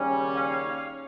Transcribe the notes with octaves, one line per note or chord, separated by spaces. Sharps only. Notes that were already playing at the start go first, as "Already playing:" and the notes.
Already playing: D#2 C#3 G3 C#4
C#5 F5